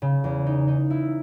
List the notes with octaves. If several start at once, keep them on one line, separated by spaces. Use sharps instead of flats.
C#3
E2
D#4
D#4
E4